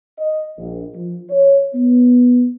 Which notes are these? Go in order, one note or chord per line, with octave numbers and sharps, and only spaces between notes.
D#5
A#1
F3
C#5
B3